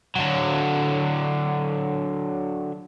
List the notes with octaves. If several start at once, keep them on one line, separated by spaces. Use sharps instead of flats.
D3 F#3